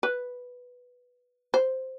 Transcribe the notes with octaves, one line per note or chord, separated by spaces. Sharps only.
B4
C5